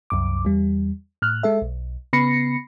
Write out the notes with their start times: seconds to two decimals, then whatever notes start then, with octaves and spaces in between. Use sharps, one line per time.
0.10 C2 F#2 D6
0.45 E2 G3
1.22 A2 F6 F#6
1.43 G#3 A4 E5
1.62 B1
2.13 C#3 B3 B5 A#6 C7 C#7